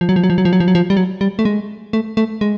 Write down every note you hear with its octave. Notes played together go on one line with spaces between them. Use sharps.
F3
F#3
F3
F#3
F3
F#3
F3
F#3
F3
F#3
F3
G3
F#3
G3
A3
G#3
A3
A3
G#3